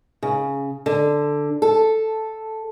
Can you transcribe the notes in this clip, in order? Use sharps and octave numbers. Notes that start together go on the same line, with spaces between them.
C#3
D3
A4